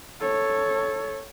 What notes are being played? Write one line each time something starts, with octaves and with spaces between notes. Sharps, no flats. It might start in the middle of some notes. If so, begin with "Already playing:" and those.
A4 C#5